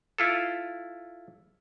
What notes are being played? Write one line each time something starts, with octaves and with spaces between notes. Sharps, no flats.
E4 F4 A4